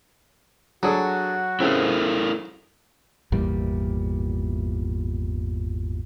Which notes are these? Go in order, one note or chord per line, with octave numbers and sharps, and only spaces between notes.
F#3 D4 F#4 G#4 A4
C#3 C4 E4 A4 A#4
G#1 E2 A#2 G3